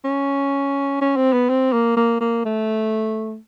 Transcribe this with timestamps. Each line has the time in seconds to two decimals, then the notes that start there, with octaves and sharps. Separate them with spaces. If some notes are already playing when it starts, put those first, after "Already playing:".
0.05 C#4
1.01 C#4
1.17 C4
1.33 B3
1.49 C4
1.73 A#3
1.97 A#3
2.21 A#3
2.45 A3